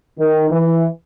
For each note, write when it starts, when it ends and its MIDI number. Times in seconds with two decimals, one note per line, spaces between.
0.19 0.50 51
0.50 0.86 52